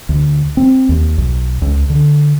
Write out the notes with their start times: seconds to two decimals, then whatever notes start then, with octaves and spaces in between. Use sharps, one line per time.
0.09 D2
0.57 C4
0.89 D#2
1.18 B1
1.62 C#2
1.90 D3